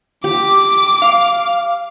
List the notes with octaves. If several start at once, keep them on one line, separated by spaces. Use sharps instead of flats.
G4 D6
F5